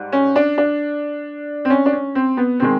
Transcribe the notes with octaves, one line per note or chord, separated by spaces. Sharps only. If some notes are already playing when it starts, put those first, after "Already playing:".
Already playing: G#2 G3
C#4
D4
D4
C4
C#4
D4
C#4
C4
B3
D#3 G#3 C4